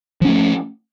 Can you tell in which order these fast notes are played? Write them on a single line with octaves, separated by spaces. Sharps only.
F3 C#4 A3